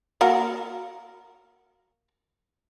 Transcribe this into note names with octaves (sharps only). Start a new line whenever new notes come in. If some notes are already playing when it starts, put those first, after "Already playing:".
A#3 F#4 A#4